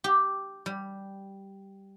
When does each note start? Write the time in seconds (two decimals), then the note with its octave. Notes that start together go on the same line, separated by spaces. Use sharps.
0.04 G4
0.66 G3